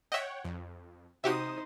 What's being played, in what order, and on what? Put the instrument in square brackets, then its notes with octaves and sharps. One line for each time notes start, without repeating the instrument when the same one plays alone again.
[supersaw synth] C#5 F#5 G5 [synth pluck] D#5 E5
[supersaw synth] F2
[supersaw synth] C3 D#6 [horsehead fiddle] D#4 C5 [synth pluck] F#4 G4 E5